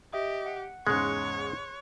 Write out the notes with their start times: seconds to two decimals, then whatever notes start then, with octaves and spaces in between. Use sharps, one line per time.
0.13 G4 D#5 E5 D#6
0.46 F#5
0.87 E2 G#2 C#3 G#3 C#5 C6 F#6 C#7